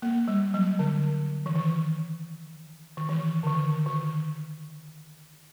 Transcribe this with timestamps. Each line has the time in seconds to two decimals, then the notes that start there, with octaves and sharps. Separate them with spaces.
0.02 A#3
0.28 G3
0.54 F#3
0.79 D3
1.46 E3
1.56 D#3
2.97 D#3
3.09 E3
3.43 D3
3.47 D#3
3.86 D#3